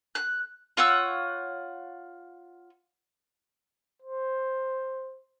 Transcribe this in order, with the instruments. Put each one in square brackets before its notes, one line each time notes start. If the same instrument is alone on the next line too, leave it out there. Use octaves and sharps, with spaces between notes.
[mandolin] F#6
F4 C#5 F#5 E6
[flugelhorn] C5